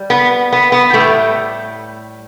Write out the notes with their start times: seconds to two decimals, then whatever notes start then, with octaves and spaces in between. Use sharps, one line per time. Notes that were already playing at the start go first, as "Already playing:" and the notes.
Already playing: G3
0.10 B3
0.52 B3
0.72 B3
0.93 A2 G3 A3